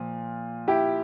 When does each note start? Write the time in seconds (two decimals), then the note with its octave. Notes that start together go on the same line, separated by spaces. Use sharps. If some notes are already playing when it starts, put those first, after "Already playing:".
Already playing: A#2 F3
0.68 E4 G4